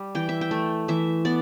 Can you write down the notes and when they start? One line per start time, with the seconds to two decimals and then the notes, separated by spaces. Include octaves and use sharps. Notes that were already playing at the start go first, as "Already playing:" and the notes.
Already playing: G3
0.15 E3 G5
0.29 E5
0.41 G5
0.51 A3
0.88 E3 E5
1.25 B3 D5